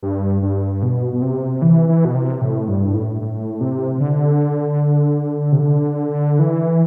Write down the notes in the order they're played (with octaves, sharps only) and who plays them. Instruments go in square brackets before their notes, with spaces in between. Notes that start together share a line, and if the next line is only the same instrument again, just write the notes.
[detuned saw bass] G2
G2
B2
B2
C3
E3
E3
B2
C3
A2
G2
A2
A2
C3
C3
D3
C3
D3
E3